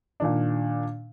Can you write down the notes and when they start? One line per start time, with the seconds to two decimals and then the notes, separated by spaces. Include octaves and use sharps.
0.20 A#2 D#3 D4